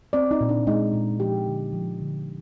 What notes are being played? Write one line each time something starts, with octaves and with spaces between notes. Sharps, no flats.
C4 D5
D#4
A#2
D4
G#3 D#4
A#2
F3 G4
D3
F3
D3